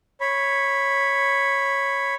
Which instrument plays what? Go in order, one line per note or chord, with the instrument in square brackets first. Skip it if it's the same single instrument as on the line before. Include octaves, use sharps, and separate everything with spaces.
[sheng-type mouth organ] C#5 B5